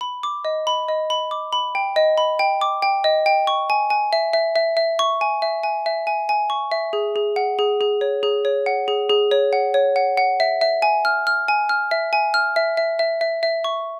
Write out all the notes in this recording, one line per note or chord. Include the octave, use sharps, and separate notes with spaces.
B5
D6
D#5
B5
D#5
B5
D6
B5
G5
D#5
B5
G5
D6
G5
D#5
G5
C#6
G#5
G#5
E5
E5
E5
E5
C#6
G#5
E5
G#5
E5
G#5
G#5
C#6
E5
G#4
G#4
F#5
G#4
G#4
C#5
G#4
C#5
F#5
G#4
G#4
C#5
F#5
C#5
F#5
F#5
E5
E5
G#5
F6
F6
G#5
F6
E5
G#5
F6
E5
E5
E5
E5
E5
C#6